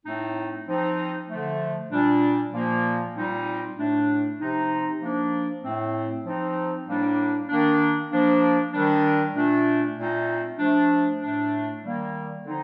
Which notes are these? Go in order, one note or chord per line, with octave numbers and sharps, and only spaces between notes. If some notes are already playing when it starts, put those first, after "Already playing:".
A2 A3 C4 D#4
F3 C4 D#4
D3 F3 A3
A#2 G3 D4
A#2 F3 A#3
A#2 G3 C4 D#4
A2 A3 D4
C3 F3 C4 D#4
F3 A#3 D4
A2 A3 C4
F3 C4 D#4
A2 G3 A#3 D4
D#3 A#3 D4
F3 A#3 D4
D#3 G3 D4
A#2 A3 D4
A#2 A3 C4 D#4
F3 A3 D4
A2 A3 D4
D#3 G3 A#3
D3 F3 C4 D#4